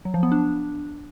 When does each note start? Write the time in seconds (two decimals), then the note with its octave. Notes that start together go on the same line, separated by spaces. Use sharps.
0.05 F#3
0.14 F3
0.23 B3
0.32 D4